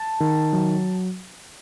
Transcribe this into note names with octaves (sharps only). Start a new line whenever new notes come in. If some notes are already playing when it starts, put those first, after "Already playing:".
Already playing: A5
D#3
F#3